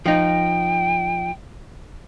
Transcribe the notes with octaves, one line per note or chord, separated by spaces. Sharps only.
F3 D#4 G5